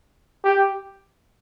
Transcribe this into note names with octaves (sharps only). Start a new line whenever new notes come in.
G4